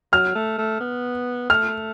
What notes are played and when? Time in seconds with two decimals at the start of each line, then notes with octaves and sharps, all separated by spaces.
0.13 F#3 F6
0.35 A3
0.58 A3
0.81 B3
1.50 A3 F6